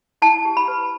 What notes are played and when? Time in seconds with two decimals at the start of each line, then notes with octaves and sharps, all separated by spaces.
0.22 E4 A5
0.45 G4
0.57 B5
0.68 B4